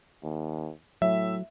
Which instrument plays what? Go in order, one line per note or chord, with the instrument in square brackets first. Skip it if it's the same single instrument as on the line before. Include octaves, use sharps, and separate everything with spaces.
[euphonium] D#2
[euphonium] A2 [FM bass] F#3 [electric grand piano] E5